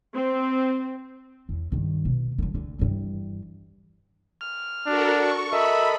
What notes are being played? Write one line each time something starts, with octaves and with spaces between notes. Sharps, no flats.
C4
E2
G2 D#3
B2
D3 E3
D2 D3
G2 E3
F6
D4 F#4 A4 A#4
C#6
A4 A#4 D#5 E5 B5